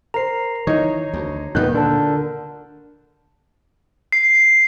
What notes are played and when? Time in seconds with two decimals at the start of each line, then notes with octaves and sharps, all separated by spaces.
0.14 A#4 C5 A#5 C7
0.67 D#3 E3 D#4 C#5
1.13 D2
1.55 D2 A#2 D#3 B3 F#6 G6
1.75 D3 A4 A#4 A5
4.12 C7